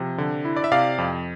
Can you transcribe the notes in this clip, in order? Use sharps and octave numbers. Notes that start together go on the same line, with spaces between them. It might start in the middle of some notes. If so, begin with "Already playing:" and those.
Already playing: C3 F3
D3
E4
D5
E5
C3 D5 F5
F2